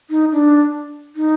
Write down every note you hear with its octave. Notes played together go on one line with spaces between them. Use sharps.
D#4
D4
D#4